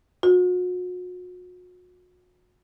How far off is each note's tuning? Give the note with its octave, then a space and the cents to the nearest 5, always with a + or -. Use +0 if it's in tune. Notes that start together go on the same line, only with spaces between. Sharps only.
F#4 -40